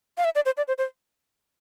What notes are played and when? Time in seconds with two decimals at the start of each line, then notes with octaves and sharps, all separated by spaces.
0.18 F5
0.25 E5
0.35 D5
0.46 C5
0.57 D5
0.68 C5
0.78 C5